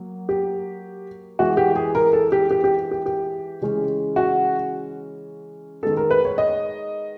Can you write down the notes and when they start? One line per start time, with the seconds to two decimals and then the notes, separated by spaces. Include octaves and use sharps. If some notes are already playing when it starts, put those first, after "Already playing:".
Already playing: F#3 A#3
0.29 G4
1.39 E3 G#3 B3 E4 F#4
1.57 G4
1.76 G#4
1.95 A#4
2.13 A4
2.32 G4
2.51 G4
2.64 G4
2.91 G4
3.06 G4
3.62 C#3 E3 G#3 C#4
4.16 F#4
5.83 D#3 G#3 B3 A4
5.97 A#4
6.11 B4
6.25 C#5
6.38 D#5